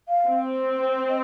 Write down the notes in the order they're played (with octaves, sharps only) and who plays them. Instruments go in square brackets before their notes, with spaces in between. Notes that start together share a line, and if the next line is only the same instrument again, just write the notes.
[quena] F5
[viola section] C4
[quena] D#5